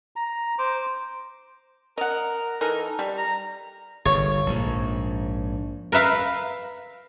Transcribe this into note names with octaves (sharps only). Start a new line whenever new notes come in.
A#5
C5 D6
A#4 D#5 F#5
E3 D#4 A4 A#4
G3
A#5
G1 C#5
A#1 G#2
A#4 B4 E5 F5